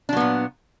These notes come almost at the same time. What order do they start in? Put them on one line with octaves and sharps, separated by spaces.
D4 F#3 B3 A#2